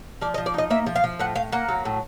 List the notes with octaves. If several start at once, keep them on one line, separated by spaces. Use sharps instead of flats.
F3 D5
D#5
F3
D5
D#4 D#5
A#3 E5
F3
F5
F3
A2 F#5
A2 F5
A#3 F#5
F#3
A2